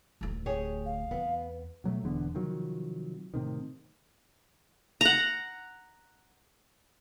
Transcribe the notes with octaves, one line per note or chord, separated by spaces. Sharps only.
D1 D2
G4 G#4 C#5
F5
E2 B3
B2 F#3 G#3 A3
E1 E2 D3 B3
C3 D#3 F3 F#3
A2 C3 D#3
F#5 A#5